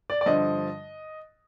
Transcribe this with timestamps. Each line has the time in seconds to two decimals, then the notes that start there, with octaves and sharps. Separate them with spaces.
0.10 D5
0.21 D5
0.26 G2 D3 F3 D#5